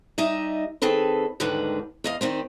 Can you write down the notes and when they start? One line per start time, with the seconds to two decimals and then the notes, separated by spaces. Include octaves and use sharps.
0.18 G3 D#4 D#5 E5
0.82 D#3 C4 G#4 A4 B4
1.40 D#2 G#2 D3 D#3 G3 B4
2.04 E2 D#5 F5
2.21 D#3 G3 C4